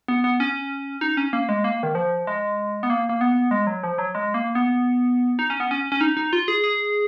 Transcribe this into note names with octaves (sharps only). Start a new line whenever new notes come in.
B3
B3
C#4
D#4
C#4
A#3
G#3
A#3
D#3
F3
G#3
B3
A#3
A#3
B3
G#3
F#3
F3
F#3
G#3
A#3
B3
D#4
C#4
B3
C#4
C#4
D#4
D#4
F4
G#4
G#4